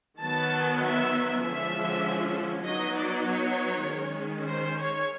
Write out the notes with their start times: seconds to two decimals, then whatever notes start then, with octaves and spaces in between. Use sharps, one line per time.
0.21 D#3 F#3 B3 A5
0.82 E5
1.43 D3 F3 G#3 C#4 E5
2.65 F#3 B3 D#4 D#5
2.96 D5
3.26 C#5
3.88 D#3 G#3 C#4
4.48 C5
4.79 C#5